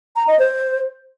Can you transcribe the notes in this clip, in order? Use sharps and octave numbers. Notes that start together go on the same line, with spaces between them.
A#5
D#5
C5